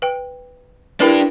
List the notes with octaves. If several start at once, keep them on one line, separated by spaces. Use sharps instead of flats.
B4 G5
D4 E4 G4 A#4 B4